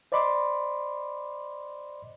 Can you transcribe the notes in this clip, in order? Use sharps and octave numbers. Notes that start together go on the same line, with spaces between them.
C5 D5 D#5 B5 C6 D6